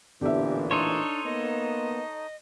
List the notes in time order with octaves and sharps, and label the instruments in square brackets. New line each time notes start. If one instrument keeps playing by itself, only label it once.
[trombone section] A1 A#2 E3 [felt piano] D3 B3 E5 [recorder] G4
[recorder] D4 [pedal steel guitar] D#4 A4 C#5 [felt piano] C6
[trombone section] A#3 B3 [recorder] D#5